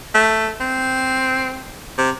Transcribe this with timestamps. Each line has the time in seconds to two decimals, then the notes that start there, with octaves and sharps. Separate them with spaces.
0.15 A3
0.61 C4
1.98 C3